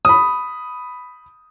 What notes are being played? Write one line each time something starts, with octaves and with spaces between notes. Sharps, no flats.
B5 D#6